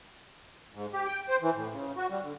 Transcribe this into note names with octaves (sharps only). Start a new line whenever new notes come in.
G#2
G4
G5
C5
E3
A2
C#3
F#4
G3
D3